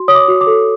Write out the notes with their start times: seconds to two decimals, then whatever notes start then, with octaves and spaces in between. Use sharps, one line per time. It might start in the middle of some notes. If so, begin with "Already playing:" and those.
Already playing: F#4 C6
0.08 C#5 D#6
0.15 D6
0.28 F#4
0.41 D6
0.47 A4